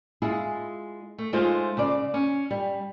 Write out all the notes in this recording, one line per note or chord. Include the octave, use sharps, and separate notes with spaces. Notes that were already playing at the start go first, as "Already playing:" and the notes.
G#3 E4 F4 G#4
A3
G#3 A3 D#4 F4 G#4 C5
C#3 D5
C#4
G3